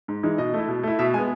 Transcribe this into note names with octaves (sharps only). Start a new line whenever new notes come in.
G#2
E3 G#3 D#4
B2 D#5
A3 E4
B2
A3 E4
B2 E5
G#3 B3 G#5